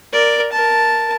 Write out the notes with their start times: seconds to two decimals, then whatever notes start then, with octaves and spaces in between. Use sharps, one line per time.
0.12 A#4 D5
0.52 A#4 A5